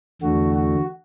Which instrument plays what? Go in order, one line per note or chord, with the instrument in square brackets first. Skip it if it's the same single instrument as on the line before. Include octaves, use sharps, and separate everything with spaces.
[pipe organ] E2 D3 A3 F#4
F#4